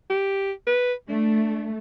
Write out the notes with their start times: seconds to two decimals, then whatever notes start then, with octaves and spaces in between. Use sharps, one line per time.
0.10 G4
0.67 B4
1.09 A3 D4